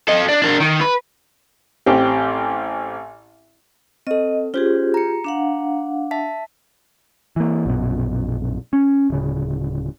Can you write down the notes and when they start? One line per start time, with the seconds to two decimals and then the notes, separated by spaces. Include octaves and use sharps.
0.08 A4 D#5
0.29 D4
0.42 D4 A#4
0.60 D#3
0.81 B4
1.86 A1 C4 G4
4.07 C4 A4 D#5
4.54 C#4 F4 G4 G#4 C5
4.94 A#5 C#7
5.24 D4 F5 F#5
6.11 E5 A5 B6
7.36 E3 A#3
7.66 A#1 F#2 B2
8.73 C#4
9.10 D1 C#3